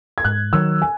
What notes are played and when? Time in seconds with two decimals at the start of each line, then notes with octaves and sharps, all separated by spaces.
0.18 G#6
0.25 G#2 F#6
0.53 D#3 F#3 E6
0.82 G#5